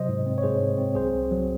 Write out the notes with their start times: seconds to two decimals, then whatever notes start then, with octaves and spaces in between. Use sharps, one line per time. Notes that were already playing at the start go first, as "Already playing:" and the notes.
Already playing: C3 F#3 C5 D#5
0.09 G#2
0.26 C4
0.38 C#5
0.43 G#2 G#4 C5
0.61 G#2
0.78 C4
0.95 C2 G#4 C5
1.13 C2
1.31 F#3